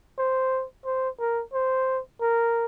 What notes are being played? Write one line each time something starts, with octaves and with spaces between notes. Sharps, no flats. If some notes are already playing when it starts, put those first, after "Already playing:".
C5
C5
A#4
C5
A#4